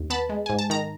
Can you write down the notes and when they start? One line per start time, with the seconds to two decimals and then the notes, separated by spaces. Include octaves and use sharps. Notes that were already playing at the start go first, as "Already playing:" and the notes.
Already playing: D#2
0.10 B3 A5 B5
0.29 G#3
0.46 G#2 G#5
0.59 A5
0.70 D#3 A#5